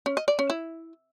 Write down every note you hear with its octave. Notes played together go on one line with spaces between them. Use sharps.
C#4
D#5
D5
C#4
E4